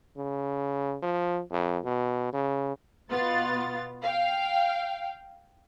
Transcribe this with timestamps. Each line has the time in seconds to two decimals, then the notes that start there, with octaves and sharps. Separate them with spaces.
0.17 C#3
1.03 F3
1.51 F2
1.84 B2
2.33 C#3
3.10 B2 B3 F4 A6
4.03 F5 G5